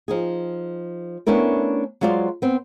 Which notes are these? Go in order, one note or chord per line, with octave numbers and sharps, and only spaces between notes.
F3 D#4 G#4
A3 B3 C#4 D4 E4 A#4
F#3 G#3 F4 C5 D5
B3 C4